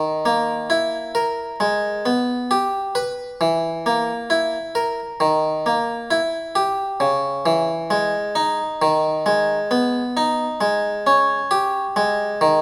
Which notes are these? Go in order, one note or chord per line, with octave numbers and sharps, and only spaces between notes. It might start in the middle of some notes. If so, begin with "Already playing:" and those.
Already playing: D#3
A#3
E4
A#4
G#3
B3
G4
B4
E3
A#3
E4
A#4
D#3
A#3
E4
G4
C#3
E3
G#3
D#4
D#3
G#3
B3
D#4
G#3
C#4
G4
G#3
D#3